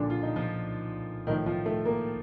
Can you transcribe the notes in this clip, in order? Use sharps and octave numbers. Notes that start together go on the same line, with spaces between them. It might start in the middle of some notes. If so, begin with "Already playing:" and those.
Already playing: A#2 D3 F3 D4
F4
D#4
F3 F4
A2 D#3 F3 D#4
F3 F4
A3 A4
A#3 A#4